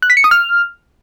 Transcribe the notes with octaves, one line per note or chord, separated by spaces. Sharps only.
F#6
B6
C#7
D#6
F6